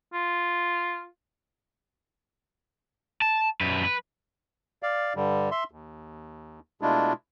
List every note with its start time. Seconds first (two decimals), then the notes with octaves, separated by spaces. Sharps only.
0.14 F4
3.22 A5
3.61 F#2 B4
3.83 B4
4.83 D5 F5
5.16 G2 D3 G3
5.51 E5 C6
5.71 D#2
6.81 B2 G#3 A3 D4 E4 F4